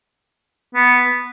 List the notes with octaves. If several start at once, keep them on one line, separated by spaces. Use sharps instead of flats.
B3